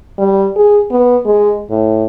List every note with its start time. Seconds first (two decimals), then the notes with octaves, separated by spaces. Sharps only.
0.18 G3
0.56 G#4
0.91 B3
1.25 G#3
1.70 A2